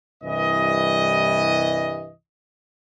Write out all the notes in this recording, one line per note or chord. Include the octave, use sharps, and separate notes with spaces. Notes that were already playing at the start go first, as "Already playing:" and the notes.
C2 G2 E3 D#5